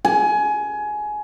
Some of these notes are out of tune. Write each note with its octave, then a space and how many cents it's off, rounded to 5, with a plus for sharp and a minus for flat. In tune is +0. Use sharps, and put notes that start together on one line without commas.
G#5 +20